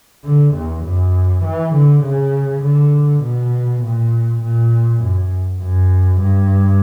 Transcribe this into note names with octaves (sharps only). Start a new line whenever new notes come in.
D3
E2
F#2
E3
D3
C#3
D3
B2
A#2
A#2
F#2
F#2
G2